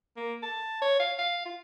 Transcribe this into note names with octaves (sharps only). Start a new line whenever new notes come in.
A#3
A5
C#5
F5
F5
F4